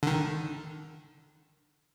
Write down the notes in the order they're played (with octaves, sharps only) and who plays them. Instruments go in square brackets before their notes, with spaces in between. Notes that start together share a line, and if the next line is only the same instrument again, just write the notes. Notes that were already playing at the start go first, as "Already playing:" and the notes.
[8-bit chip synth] D3 D#3